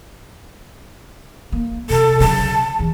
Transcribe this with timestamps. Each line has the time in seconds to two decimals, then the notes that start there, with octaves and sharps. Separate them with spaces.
1.52 A#3
1.90 C3 A4
2.20 C#3 F#3 A5
2.79 E2